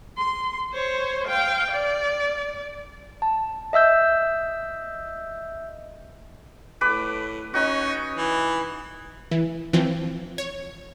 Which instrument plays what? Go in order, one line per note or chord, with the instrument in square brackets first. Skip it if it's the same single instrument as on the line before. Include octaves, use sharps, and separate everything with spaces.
[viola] C6
C5 C#5
F5 G5
D5
[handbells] A5
D#5 E5 E6 G6
[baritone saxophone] A2 [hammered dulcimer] B4 D6
[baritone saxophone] C#4 [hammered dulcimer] D#4 F#4
[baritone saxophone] E3
[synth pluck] E3
E3 F3 C4
C#5